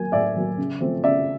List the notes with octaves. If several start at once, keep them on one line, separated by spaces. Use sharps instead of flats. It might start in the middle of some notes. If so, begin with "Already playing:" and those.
Already playing: F#3 A#3 G#5
A2 D5 E5
F#3 A#3
C#3
F3 A3 C4
C#3 D5 E5